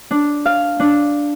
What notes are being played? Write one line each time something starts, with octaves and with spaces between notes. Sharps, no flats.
D4
F5
D4